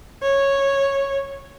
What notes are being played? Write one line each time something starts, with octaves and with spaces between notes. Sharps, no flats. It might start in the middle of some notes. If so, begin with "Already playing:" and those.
C#5